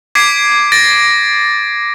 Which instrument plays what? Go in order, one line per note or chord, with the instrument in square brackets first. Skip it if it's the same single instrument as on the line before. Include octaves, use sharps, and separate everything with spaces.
[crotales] D6 G#6 B6 C7 D7
A6 A#6 D7